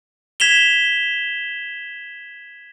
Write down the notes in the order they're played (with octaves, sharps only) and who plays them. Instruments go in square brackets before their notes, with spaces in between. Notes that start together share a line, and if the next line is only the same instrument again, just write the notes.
[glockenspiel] G#6 B6 E7 F7 G7